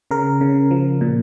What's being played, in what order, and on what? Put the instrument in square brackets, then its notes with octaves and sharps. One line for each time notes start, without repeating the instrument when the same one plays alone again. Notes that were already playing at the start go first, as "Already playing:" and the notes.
[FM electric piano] C#3 A#4
C#3
F3
A#2